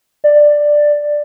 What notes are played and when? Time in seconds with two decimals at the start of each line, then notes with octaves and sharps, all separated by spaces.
0.24 D5